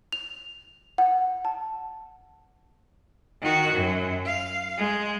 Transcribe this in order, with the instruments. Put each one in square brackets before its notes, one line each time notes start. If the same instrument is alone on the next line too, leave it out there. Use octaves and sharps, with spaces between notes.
[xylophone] F7
F#5
A5
[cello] D#3 F#4
F#2
F5
G#3